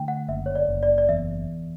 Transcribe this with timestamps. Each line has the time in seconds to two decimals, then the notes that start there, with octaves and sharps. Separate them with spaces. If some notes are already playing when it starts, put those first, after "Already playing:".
Already playing: D3 A3 G5
0.08 F#5
0.28 F#1 E5
0.46 C#5
0.55 D5
0.69 F#1
0.83 D5
0.98 D5
1.09 E2 E5